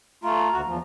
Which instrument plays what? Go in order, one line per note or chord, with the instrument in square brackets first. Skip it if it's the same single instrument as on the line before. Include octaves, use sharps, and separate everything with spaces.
[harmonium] A3 F4 [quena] A#5
[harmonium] D2 F#4
E2 F3